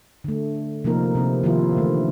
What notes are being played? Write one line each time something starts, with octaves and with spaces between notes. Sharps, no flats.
D3 A3
C3 F3 A#3 D#4 A#4
C3 C4 E4
D#3 F3 A#3 E4 F4
D3 E3 A3